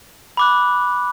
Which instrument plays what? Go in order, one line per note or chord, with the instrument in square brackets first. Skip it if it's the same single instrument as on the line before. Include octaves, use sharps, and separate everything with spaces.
[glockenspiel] B5 D6 F#6